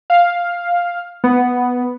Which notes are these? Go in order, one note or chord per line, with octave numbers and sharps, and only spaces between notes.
F5
B3